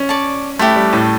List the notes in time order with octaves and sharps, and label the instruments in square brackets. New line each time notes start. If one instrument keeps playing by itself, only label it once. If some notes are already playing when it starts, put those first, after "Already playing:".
Already playing: [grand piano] C#4
[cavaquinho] D5 A5 C#6
[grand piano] A3 [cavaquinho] E4 G4 B4
[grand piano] G3
A2